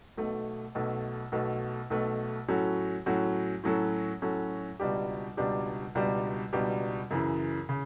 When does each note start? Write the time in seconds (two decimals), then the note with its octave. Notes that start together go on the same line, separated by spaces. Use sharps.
0.17 B1 B2 A3
0.75 B1 B2 A3
1.32 B1 B2 A3
1.90 B1 B2 A3
2.48 A2 F#3 C#4 F#4 A4
3.06 A2 F#3 C#4 F#4 A4
3.64 A2 F#3 C#4 F#4 A4
4.22 A2 F#3 C#4 F#4 A4
4.80 C#2 B2 G3 D4 G4
5.37 C#2 B2 G3 D4 G4
5.95 C#2 B2 G3 D4 G4
6.53 C#2 B2 G3 D4 G4
7.11 F#2 C#3 E3
7.69 C#3